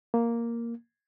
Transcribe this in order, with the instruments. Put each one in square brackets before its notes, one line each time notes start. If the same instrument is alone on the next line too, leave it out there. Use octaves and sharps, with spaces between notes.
[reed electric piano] A#3